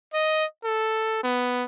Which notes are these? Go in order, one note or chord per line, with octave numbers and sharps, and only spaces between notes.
D#5
A4
B3